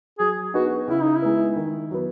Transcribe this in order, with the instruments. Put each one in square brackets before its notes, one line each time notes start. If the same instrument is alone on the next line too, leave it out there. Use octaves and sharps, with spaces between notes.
[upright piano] F#3 [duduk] G#4
[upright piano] B3 D#4 G#4 [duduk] F#4
[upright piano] C#3 [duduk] E4
[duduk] D#4
E4
[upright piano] G#3 B3
D#3
F#3 B3